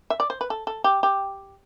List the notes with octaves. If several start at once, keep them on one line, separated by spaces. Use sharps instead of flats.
E5
D5
C5
B4
A4
A4
G4
G4